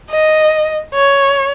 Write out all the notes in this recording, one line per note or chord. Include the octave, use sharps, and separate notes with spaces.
D#5
C#5